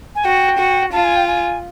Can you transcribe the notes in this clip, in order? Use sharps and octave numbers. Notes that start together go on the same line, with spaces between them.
G#5
F#4 G5
F#4
F4 A5
G#5
G5
G#5